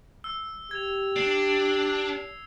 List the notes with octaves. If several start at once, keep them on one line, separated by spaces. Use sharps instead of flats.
E6
G4 G#6 F7
D4 C7